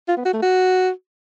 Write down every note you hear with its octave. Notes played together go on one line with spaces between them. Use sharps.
F4
B3
F#4
A3
F#4